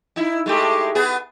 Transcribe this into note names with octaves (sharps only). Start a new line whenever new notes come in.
D#4 E4
G#3 A3 G4
B3 G#4